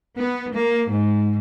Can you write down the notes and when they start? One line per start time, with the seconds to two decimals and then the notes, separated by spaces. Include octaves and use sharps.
0.17 B3
0.53 A#3
0.89 G#2